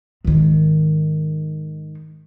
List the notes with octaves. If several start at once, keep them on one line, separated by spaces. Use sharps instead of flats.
G#2 D#3